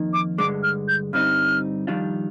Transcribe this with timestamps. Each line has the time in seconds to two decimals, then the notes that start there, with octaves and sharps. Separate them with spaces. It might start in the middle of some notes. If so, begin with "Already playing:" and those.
Already playing: F2 D#3 A#3 D#4
0.13 D6
0.38 G2 D3 G#3 D6
0.63 F6
0.88 G6
1.13 G2 D3 G3 C4 D#4 F6
1.87 F2 D#3 G3 D4 F4